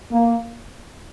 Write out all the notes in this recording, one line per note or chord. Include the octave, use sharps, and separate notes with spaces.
A#3